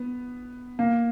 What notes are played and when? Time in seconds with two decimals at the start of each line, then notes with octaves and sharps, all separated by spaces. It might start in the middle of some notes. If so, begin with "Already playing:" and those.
Already playing: B3
0.79 A#3